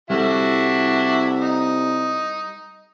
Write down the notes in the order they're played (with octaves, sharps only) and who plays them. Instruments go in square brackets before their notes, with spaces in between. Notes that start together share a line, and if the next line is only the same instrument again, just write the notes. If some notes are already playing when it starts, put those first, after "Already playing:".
[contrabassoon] C2 [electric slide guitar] G3 A4 [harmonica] D4 E4 F#4
[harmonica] D#4